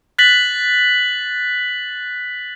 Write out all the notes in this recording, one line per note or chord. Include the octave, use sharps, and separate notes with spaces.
F#6 A6 B6 F#7